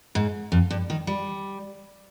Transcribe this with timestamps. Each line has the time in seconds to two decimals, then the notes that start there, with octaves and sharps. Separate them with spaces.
0.15 G#2
0.52 F2
0.71 G2
0.90 D#3
1.07 G3